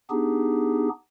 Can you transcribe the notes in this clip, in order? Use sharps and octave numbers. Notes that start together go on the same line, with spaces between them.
B3 D4 D#4 G4 G#4